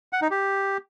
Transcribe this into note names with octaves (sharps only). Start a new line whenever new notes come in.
F#5
D#4
G4